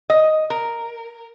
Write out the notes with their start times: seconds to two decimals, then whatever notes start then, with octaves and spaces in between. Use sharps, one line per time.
0.10 D#5
0.50 A#4